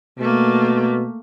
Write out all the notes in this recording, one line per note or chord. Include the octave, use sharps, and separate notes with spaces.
B2 A3 A#3